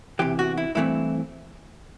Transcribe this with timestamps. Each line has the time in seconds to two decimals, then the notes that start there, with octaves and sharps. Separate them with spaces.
0.19 E2 C3 E3 G4
0.39 F#4
0.57 E4
0.75 G2 E3 A3 C4 E4